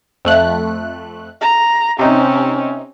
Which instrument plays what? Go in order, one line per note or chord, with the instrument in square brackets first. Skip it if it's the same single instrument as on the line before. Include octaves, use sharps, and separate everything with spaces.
[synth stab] F2 A3 F#6
[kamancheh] A#5
[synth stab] C3 D#4 [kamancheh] C4 C#4